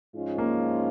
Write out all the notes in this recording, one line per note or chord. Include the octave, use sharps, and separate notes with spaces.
G#2 F3 G#3 C#4 F4
A#3